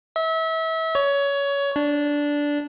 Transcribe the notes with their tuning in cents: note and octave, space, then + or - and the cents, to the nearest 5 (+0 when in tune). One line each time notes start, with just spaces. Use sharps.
E5 -30
C#5 +20
D4 -10